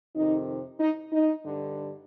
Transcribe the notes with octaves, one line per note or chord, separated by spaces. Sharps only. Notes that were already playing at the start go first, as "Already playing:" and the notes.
F2 C3 D#3 D#4
D#4
D#4
G2 D3